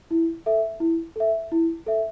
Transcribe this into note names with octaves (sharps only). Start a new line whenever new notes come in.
E4
A4 E5
E4
A4 E5
E4
A4 E5